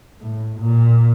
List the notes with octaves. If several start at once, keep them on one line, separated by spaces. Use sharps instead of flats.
A2
A#2